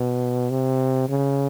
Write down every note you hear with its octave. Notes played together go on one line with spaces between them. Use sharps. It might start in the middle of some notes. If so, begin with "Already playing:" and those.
Already playing: B2
C3
C#3